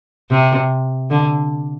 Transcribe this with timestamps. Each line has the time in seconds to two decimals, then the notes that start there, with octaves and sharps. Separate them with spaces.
0.31 C3
1.11 D3